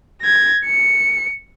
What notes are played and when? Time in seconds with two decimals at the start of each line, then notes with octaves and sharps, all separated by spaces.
0.22 G#6 A#6
0.66 C#7